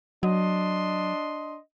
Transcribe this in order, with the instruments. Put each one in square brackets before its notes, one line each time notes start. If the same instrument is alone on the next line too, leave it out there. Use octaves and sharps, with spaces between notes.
[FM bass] F#3 [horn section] D4 D#5 C6